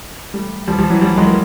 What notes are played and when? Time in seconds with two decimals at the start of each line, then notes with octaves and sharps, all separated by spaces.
0.34 G3 A3
0.67 F3 G3
0.78 F3 G3
0.90 E3 F#3
1.01 F3 G3
1.13 A3
1.17 F#3 G#3
1.27 A#3